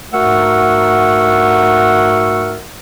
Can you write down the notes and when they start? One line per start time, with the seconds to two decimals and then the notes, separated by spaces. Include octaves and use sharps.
0.13 G#2 A3 F#4 A#4 F#5 E6